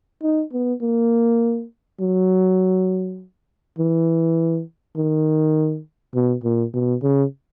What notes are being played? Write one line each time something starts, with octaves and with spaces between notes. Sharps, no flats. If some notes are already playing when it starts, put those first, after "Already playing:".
D#4
B3
A#3
F#3
E3
D#3
B2
A#2
B2
C#3